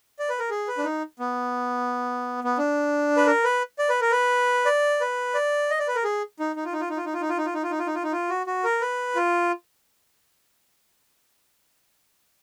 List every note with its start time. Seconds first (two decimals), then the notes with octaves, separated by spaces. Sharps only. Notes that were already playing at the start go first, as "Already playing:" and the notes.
0.19 D5
0.29 B4
0.39 A#4
0.50 G#4
0.68 B4
0.78 D4
0.84 D#4
1.19 B3
2.44 B3
2.58 D4
3.17 B4
3.27 A#4
3.44 B4
3.79 D5
3.89 B4
4.01 A#4
4.11 B4
4.66 D5
5.01 B4
5.34 D5
5.70 D#5
5.79 D5
5.88 B4
5.95 A#4
6.04 G#4
6.39 D#4
6.56 D#4
6.65 F4
6.73 D#4
6.81 F4
6.90 D#4
6.97 F4
7.05 D#4
7.13 F4
7.21 D#4
7.29 F4
7.38 D#4
7.46 F4
7.54 D#4
7.63 F4
7.71 D#4
7.79 F4
7.87 D#4
7.95 F4
8.03 D#4
8.12 F4
8.30 F#4
8.47 F#4
8.64 A#4
8.81 B4
9.15 F4